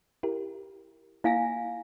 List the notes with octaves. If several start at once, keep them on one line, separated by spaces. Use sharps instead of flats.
E4 G4 A#4
A#3 E4 F5 G#5 A#6